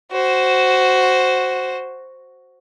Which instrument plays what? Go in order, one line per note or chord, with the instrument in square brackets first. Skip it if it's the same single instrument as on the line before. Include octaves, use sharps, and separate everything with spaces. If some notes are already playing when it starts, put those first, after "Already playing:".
[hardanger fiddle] F#4 C5